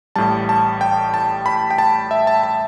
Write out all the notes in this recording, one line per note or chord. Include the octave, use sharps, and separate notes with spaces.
A1 A2 G3 A5
A5
G5
A5
B5
G5
A5
E5
A5
A5